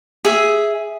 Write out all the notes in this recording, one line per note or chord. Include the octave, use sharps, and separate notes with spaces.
G#4 E5